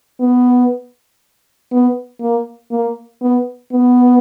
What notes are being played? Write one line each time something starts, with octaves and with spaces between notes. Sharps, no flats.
B3
B3
A#3
A#3
B3
B3